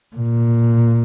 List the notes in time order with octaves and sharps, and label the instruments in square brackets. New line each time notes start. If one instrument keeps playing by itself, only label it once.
[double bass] A#2